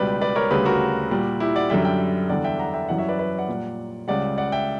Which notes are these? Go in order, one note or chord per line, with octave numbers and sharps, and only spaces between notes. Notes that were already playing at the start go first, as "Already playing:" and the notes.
Already playing: C#2 B2 G3 B4 D5
B4 D5
A#4 C#5
D2 C#3 G3 G4 B4
F#4 A#4
A#2 G3
E4 G4
D5 F#5
F#2 D3 G3 E5 G5
E5 G5
E2 D3 G3 D5 F#5
E5 G5
F#5 A#5
E5 G5
F#2 E3 G3 D5 F#5
C#5 E5
B4 D5
B4 D5
D5 F#5
A#2 G3
C#2 C#3 G3 D5 F#5
D5 F#5
E5 G5